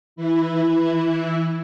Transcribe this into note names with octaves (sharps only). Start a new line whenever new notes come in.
E3 E4